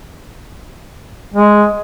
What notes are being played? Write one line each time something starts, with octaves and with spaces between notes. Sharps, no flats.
G#3